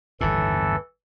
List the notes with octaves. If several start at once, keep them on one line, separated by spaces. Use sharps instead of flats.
G1 D#2 A2 E3 A4